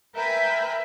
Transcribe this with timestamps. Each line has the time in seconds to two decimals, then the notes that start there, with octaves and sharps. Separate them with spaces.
0.15 A#4 B4 E5 G5 G#5 B5